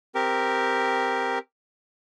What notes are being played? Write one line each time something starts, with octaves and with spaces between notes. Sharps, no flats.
C4 G4 A#4